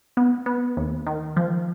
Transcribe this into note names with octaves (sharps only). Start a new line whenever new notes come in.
B3
B3
D#2
D#3
F3